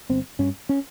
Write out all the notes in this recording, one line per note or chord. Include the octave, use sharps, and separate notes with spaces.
G1 C4
G2 C#4
C#4